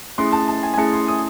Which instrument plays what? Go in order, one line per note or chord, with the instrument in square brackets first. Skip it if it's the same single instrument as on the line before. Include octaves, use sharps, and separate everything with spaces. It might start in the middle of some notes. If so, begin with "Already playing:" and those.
[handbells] A3 C#4 E4 G#4 [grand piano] C6
[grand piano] A5
A5
G#5
G#5
[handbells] A3 C#4 E4 G#4 [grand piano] A5
[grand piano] C6
D#6